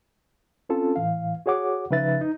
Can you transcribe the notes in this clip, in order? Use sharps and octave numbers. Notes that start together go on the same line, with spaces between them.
C4 C#4 F4 A4 A5
A2 E3 F5
F#4 G#4 C#5 F#5 D6
C#3 F3 D#4 B4 E5 A6
D#4